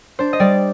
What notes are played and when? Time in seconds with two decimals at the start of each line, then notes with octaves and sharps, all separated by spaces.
0.19 D4 C5
0.33 D#5
0.40 G3 D5